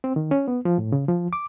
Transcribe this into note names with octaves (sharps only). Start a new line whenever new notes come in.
C4
D#3
C#4
B3
F3
A2
C#3
F3
D6